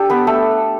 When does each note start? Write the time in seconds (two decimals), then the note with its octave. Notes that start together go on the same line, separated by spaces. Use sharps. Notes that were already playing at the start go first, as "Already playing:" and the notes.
Already playing: D4 G4 A4
0.10 B3 B4
0.27 A3 A4